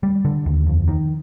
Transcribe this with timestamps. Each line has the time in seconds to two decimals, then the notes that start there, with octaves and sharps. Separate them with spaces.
0.03 G3
0.25 D3
0.46 D#2
0.67 F2
0.88 D#3